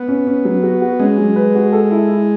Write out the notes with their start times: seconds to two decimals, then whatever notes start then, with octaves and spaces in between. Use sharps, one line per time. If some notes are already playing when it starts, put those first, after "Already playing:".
Already playing: B3
0.08 C#4
0.27 C#4
0.45 F#3
0.63 F#4
0.82 F#4
1.00 G#3 C#4
1.18 F#3
1.36 B4
1.55 F#4
1.73 A4
1.91 E4
2.09 E4